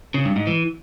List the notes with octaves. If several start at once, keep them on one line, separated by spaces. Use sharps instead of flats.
C#3
G2
G#2
E3